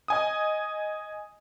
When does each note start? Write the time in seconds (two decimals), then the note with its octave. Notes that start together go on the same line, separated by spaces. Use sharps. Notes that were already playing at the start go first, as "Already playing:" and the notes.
0.08 D#5 G#5 D#6